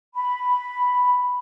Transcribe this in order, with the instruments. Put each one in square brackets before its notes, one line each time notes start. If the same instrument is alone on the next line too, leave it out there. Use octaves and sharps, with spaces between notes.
[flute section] B5